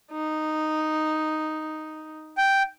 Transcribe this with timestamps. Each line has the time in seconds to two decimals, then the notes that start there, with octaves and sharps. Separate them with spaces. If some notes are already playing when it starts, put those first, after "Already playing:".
0.11 D#4
2.38 G5